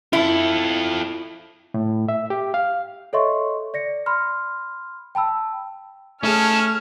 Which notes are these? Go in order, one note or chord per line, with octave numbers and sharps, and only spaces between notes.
E4 F4 A4
A2
E5
G4
F5
A4 C#5 D#5 E5 C6 C#6
D5 A#6 C#7
B5 C6 F6
G5 A5 B5 E6
A3 C#4 D#4 G#4 A5 F6